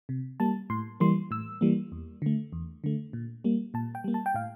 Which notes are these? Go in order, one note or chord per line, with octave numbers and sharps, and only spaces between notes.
C3
G3 A#3 A5
A2 C6
E3 G3 A#3 C6
A2 E6
E3 G3 A#3
E2
D3 A3
E2
D3 A3
A#2
G3 A#3
A#2 A5
G5
G3 A#3
A5
G5
A2 F5